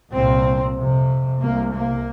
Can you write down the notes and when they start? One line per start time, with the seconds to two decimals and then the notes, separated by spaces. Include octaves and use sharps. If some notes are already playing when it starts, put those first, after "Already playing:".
0.12 C2 A#2 C4
0.76 F2 C3
1.40 C2 C3 A#3
1.72 A#3